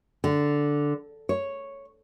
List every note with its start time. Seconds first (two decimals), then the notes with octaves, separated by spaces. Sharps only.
0.24 D3
1.29 C#5